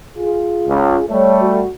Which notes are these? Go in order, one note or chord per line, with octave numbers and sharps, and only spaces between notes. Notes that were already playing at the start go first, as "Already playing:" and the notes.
F4 G#4
C#2
G3 A3 C#5
F#4